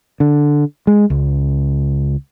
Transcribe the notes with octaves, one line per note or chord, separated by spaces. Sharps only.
D3
G#3
C#2